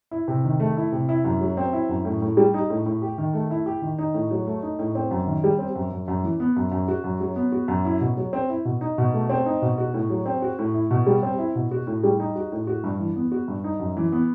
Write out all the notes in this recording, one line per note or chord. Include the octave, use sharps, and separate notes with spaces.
E4
C3
D#3
A3
E4
C3
E4
F#2
F#3
C4
E4
F#2
A2
A2
G3
D#4
A2
A2
G4
D#3
A3
E4
G4
D#3
D#4
A2
F#3
A3
D#4
A2
C4
F#2
D#3
G3
C4
F#2
F#2
F#2
E3
B3
F#2
F#2
F#4
F#2
F#3
B3
F#4
F#2
E4
B2
F#3
C4
E4
B2
D#4
B2
A3
C4
D#4
B2
F#4
A2
F#3
C4
F#4
A2
E4
B2
G3
C4
E4
B2
F#4
A2
G3
D#4
F#4
A2
F#4
G2
E3
B3
F#4
G2
D#4
F#2
E3
B3